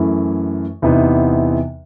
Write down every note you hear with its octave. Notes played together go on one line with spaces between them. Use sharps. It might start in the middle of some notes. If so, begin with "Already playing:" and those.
Already playing: F#2 E3 A3 E4
E2 C3 E3 B3 D#4